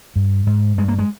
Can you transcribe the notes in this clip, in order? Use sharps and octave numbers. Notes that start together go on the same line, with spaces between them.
G2
G#2
G2 G#3
A#3
G#3